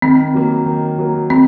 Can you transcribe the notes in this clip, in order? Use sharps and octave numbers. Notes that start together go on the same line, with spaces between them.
D#3 C4
F#3 A#3
D#3
F#3 A#3
D#3 C4